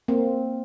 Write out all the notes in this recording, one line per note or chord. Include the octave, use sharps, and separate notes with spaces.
A#3 C4